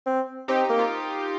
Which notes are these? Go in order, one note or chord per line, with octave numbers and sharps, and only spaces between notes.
C4
C4 D#4 G4
A#3
F4